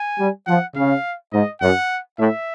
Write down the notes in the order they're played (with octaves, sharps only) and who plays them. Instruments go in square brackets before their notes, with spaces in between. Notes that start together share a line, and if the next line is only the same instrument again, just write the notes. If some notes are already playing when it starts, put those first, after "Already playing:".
Already playing: [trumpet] G#5
[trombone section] G3
[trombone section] F3 [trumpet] F#5
[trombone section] C#3 [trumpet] F5
[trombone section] G#2 [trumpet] D#5
[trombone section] F#2 [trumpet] F#5
[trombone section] A2 [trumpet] E5